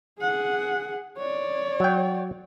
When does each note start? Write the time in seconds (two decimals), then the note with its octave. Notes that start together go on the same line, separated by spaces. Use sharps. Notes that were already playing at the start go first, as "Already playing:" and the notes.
0.20 G#4 F#5
1.18 C#5 D5
1.80 F#3 G5